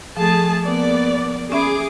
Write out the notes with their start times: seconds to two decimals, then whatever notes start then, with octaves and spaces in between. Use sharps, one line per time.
0.17 F3 A3 G#4 A5
0.65 A#3 B3 D5
1.52 C#4 G#4 E5 B5 D6